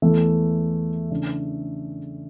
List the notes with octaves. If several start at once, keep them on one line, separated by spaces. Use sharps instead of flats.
E2 E3 A3
C#3 E3 A3 D4